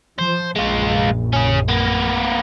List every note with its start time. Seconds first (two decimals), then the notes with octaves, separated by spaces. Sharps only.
0.19 F3 C5
0.56 A#1 F#2 G#3 F4
1.33 C#4 G#4
1.68 A#3 B3